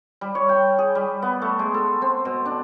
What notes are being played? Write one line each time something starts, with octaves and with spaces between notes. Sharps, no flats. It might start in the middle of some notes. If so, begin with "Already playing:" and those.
G3
C#5
G5
G#4
G3
B3
A3
G#3
A4
C4
B2
D4